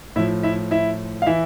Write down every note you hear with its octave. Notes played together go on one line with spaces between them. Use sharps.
A2 F3 E4 E5
E4 E5
E4 E5
F5
E3 E4 E5